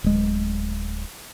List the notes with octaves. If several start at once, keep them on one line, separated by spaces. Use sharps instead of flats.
D1 G#3